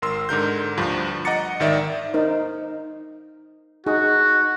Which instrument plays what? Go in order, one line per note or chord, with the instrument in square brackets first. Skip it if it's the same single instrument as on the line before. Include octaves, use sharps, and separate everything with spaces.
[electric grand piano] G#1 A#4 C6 E6
G#2 D3 A#4 G6
D2 G2 F3
D#5 F#5 A#5 D6 A6 C#7
G#1 D#3 D5 E5
[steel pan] D#4 A#4 C5
[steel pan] D#4 G#4 [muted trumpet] F#4